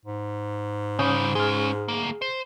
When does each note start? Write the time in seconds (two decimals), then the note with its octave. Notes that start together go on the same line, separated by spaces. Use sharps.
0.05 G#2
0.99 C#3 G3 C#4 D#6 G6
1.35 G#3 C#4 G#4 F6
1.88 D2 A#3
2.22 C5